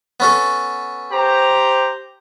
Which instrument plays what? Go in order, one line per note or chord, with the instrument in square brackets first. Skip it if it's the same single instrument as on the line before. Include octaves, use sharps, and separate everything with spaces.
[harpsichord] B3 C#4 A4
[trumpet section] G4 C5 A#5